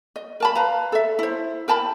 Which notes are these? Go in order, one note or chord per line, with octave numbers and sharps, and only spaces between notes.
D#5
A#4 A5 B5
B4 F5 A#5
A4 E5
E4 C5
A#4 G5 A5 B5